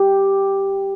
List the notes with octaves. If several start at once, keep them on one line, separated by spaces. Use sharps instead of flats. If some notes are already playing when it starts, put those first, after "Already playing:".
Already playing: G4